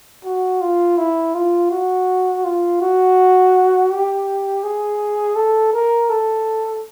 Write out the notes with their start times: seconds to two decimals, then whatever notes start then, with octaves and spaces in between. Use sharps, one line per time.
0.24 F#4
0.61 F4
0.98 E4
1.34 F4
1.71 F#4
2.44 F4
2.81 F#4
3.91 G4
4.63 G#4
5.36 A4
5.73 A#4
6.10 A4